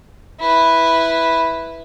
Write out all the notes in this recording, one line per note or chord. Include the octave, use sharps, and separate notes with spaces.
E4 B4